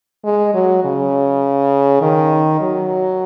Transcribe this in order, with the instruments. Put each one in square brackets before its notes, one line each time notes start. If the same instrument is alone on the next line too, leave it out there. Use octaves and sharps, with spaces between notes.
[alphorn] G#3
F#3
C#3
D#3
F#3